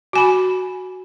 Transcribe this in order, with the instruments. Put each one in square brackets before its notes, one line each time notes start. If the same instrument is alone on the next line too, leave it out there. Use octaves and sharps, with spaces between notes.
[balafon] F#4 G#5 B5